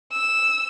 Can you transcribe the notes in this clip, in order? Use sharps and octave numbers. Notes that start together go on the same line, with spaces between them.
E6